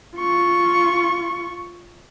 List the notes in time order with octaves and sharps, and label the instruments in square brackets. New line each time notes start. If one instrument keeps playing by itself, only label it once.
[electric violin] F4 C#6